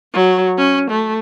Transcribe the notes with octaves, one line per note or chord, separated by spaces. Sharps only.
F#3
C#4
A3